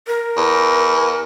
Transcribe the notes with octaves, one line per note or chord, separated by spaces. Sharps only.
A#4
E2